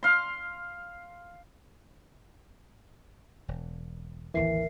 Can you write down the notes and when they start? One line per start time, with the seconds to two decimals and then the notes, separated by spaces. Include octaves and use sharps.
0.03 F5 C6
3.48 E1
4.34 A1 D#2 D3 E3 A#4 E5 C7